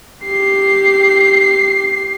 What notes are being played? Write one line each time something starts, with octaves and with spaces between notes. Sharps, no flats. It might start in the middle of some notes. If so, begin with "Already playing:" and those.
G4 C7